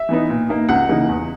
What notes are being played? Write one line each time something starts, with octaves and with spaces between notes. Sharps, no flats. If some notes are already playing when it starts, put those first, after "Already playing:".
Already playing: E5
E3 B3 D#4
A#2
A#3 D#4
C#2 F#5
C#3 E3 A#3 D#4
E2